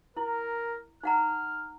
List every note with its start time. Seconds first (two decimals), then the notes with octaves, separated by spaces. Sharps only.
0.17 E4 A#4
1.03 D#4 F#5 A#5 F6